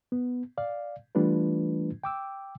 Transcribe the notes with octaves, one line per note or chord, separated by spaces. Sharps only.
B3
D5 F5
E3 G3 A3 D4 F4 B4
G5 D6 E6